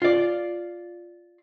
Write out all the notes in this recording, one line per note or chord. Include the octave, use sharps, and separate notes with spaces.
F4 D5